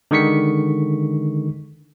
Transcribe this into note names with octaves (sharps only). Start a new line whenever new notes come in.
D3 D#3 G#3 C#6 B6 C#7